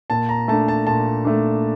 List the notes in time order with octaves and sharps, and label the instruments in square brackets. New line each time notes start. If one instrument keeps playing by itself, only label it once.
[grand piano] A#2 A5
A#5
A3 D4 A5
A5
A#2 A5
A3 D4